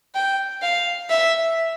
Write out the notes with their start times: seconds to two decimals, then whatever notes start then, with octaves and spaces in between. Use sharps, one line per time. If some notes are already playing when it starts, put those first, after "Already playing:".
0.15 G5
0.62 F5
1.09 E5